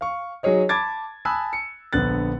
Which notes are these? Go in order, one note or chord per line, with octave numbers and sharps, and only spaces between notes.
F5 C#6
F#3 D#4 G#4 C#5 D#5
A5 B5 D6 G#6 A6
G#5 A5 B5 D#6 E6 F#6
C#7
A#1 D3 B3 F#6 A6